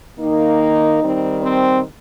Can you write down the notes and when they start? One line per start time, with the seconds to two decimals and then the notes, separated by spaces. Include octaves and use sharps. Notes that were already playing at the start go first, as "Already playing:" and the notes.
0.19 D#3 A#3 D#4
1.01 D#3 G3 C4
1.42 C4